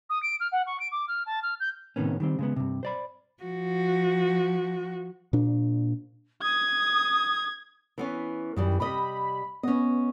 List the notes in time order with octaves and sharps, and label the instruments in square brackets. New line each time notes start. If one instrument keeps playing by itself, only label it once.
[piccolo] D#6
D7
F6
F#5
C#6
D7
D6
F6
A5
F6
G6
[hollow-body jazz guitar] A2 C3 D#3 B3 C#4
D#3 G3 C4
C#3 G#3 B3
G2 C3
C5 D5 B5
[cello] F3 F#4
[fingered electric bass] A#2 D4
[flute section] D#6 [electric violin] G#6
[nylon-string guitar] E3 B3 C#4
[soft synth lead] F#2 [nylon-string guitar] D#3 E3 G3
[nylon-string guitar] C3 G3 D#5 [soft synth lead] B5
[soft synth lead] B3 [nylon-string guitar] C#4 D#5